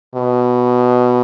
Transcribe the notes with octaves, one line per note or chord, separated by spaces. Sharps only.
B2